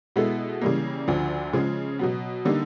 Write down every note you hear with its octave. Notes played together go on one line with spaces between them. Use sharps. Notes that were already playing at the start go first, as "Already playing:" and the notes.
B2 G#3 B3 E4 A4
C#3 E3 G3 A#3
D2 D3 F3
C#3 F3 G#3
B2 F#3 B3
D3 G3 A#3 D#4